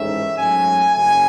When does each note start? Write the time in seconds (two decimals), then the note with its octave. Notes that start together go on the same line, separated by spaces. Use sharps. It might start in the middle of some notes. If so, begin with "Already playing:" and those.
Already playing: A1 G#2 D#3 A3 C#4 E5
0.37 G#2 F#3 A3 C#4 G#5
0.95 F#1 F#2 C#3 G#5